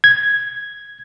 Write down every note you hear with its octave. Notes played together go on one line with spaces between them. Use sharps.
G#6